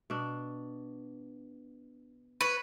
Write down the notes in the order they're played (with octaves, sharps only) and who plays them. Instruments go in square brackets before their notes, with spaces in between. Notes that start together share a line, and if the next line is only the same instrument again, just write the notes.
[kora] B2 D4
[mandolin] B4 [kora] C#5